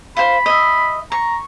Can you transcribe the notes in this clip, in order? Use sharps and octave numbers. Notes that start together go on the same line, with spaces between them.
F4 C5 B5
D#5 E5
A#5 C#6